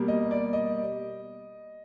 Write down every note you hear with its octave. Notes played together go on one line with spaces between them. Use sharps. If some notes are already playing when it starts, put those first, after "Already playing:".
Already playing: B2 G3 A#3
D#5
D5
D#5